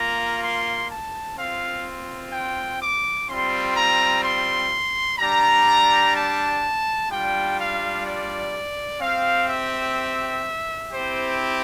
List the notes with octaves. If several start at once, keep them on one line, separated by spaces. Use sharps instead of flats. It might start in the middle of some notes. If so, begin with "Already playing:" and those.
Already playing: A#3 F4 A#5
C6
A5
C4 F4 F5
G5
D6
G3 C4 F4 C6
A#5
C6
G3 D4 G4 A#5
A5
G3 D4 F4 G5
F5
D5
C4 G4 F5
E5
C4 E4 G4 C5